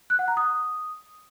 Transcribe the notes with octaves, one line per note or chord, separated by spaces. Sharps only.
F#6
F#5
A#5
D#6